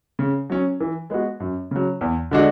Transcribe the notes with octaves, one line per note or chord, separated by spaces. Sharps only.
C#3
F#3 C#4
E3
G#3 B3 F#4
F#2
C#3 F#3
E2
D3 G#3 D4 F#4